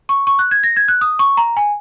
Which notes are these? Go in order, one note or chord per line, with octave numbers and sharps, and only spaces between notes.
C#6
C#6
F#6
G#6
A#6
G#6
F#6
D#6
C#6
A#5
G#5